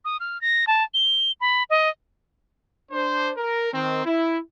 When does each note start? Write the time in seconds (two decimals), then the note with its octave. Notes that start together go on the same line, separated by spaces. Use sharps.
0.05 D#6
0.20 F6
0.41 A#6
0.67 A5
0.94 G7
1.41 B5
1.70 D#5
2.91 D4 C5
3.36 A#4
3.73 D#3 C4
4.04 E4